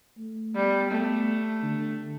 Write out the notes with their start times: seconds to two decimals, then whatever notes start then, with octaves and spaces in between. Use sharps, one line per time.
0.18 A3
0.55 G3 B3
0.91 A3 B3
1.63 D3